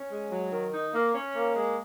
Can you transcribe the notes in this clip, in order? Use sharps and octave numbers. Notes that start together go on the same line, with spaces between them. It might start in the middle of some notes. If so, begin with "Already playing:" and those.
Already playing: C#4
G#3
F#3
D#3
D#4
A#3
C#4
A#3
G#3